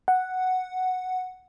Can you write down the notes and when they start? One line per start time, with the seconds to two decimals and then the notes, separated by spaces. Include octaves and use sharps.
0.08 F#5